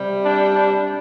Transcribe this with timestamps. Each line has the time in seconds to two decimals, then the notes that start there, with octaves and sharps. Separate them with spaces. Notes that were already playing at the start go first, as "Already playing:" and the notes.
Already playing: C3 G3
0.25 D4
0.55 D4